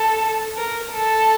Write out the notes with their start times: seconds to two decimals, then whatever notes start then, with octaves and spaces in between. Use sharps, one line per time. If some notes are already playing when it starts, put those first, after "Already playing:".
Already playing: A4
0.57 A#4
0.92 A4